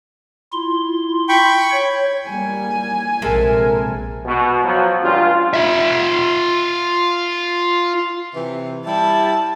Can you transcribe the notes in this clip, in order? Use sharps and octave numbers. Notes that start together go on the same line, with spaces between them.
E4 F4 C6
G5 B5 C#6
C#5
G3 A#3 G#5
A#1 C3 G#3 A4 A#4 E5
B2
B2 F3 F#3
C#2 G2 F4
F4 E5
C3 E3
G3 E4 A5